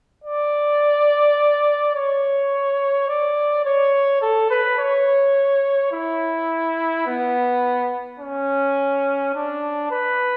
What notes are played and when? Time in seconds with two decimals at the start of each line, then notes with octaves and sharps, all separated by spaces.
0.24 D5
1.95 C#5
3.08 D5
3.65 C#5
4.21 A4
4.50 B4
4.78 C#5
5.92 E4
7.06 B3
8.20 C#4
9.34 D4
9.92 B4